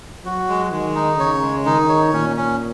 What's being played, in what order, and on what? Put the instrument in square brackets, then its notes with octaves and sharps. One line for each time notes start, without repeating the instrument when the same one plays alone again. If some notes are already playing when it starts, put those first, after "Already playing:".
[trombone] F#3 [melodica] F#4
[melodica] G#3
[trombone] D#3 [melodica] G#3
[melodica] D#4
[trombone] C#3 [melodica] C#5
[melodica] G#3
[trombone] D#3 [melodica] D#4
[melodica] C#5
[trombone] A#2 [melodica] C#4
[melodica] C#4